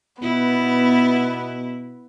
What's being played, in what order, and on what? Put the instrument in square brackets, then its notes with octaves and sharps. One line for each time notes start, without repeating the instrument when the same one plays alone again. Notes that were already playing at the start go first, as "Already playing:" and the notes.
[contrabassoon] B2 [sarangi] B3 [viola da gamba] E4